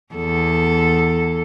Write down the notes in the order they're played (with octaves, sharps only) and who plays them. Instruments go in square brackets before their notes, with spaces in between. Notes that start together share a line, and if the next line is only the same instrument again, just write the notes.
[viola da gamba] E2 A4